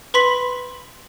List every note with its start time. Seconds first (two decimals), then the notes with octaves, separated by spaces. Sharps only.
0.14 B4 B5 C6 B6 F#7